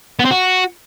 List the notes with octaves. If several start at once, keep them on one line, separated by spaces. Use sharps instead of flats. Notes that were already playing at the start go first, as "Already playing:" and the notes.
B3
C4
F#4